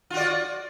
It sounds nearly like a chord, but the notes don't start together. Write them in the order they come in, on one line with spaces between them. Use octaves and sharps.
F4 F#4 D5